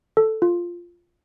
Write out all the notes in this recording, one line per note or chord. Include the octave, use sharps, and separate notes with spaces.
A4
F4